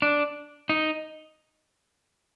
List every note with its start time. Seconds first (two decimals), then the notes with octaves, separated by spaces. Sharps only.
0.02 D4
0.69 D#4